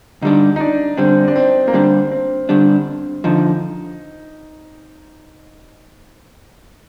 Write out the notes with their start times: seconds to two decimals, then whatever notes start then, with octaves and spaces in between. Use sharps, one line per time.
0.22 D3 G3 D4 D#4
0.56 D#4
0.60 D4
0.97 D3 G3 C4 D4
1.28 D4
1.36 C4
1.67 A#3
1.73 D3 G3 C4 D4
2.12 C4
2.49 D3 G3 D4
3.24 D3 F3 D#4